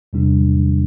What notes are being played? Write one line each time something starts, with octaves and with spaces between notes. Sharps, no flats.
E2 C3 G3 D4